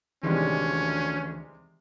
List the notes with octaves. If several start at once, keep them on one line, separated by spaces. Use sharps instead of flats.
D2 C3 D#3 E3 G3 G#3 C#4